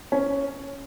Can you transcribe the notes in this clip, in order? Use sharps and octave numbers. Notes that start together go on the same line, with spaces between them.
C#4